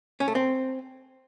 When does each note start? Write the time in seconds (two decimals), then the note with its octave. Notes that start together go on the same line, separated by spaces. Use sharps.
0.20 C#4
0.28 A3
0.35 C4